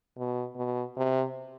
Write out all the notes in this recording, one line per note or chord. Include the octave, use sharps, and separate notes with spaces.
B2
B2
C3